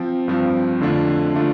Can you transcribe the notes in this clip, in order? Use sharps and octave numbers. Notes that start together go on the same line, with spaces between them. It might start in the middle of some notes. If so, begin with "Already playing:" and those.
Already playing: F3 C4
G2 F3 C4
F2 D3 A3 D4 F4
D3 A3 D4 F4